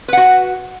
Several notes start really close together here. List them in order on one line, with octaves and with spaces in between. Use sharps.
B4 F#5 F#4